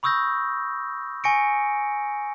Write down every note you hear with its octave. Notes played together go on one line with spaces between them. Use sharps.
B5 C#6 D#6 E6 G6 A#6
G#5 C#6 A#6 C#7 D7